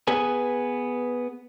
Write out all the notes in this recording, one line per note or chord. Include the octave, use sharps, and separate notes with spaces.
B3 G#4 B4 G#5